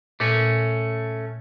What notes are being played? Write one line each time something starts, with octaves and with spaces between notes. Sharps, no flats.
A#2 A3 C#4